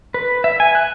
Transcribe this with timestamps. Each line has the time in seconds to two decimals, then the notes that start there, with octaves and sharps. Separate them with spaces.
0.14 B4
0.44 E5
0.60 G#5
0.75 F#6